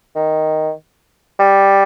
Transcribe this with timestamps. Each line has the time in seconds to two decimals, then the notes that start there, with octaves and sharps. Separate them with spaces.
0.16 D#3
1.39 G3